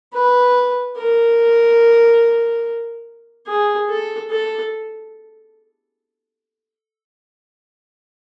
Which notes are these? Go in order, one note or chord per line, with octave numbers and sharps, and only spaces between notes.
B4
A#4
G#4
A4
A4